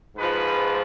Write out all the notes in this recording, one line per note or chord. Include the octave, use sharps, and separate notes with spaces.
G#2 F3 B4